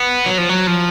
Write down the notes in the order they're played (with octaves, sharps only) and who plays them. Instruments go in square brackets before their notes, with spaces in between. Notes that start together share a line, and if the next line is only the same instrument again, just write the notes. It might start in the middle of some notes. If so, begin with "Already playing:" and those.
Already playing: [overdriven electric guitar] B3
F#3
F3
F#3
F3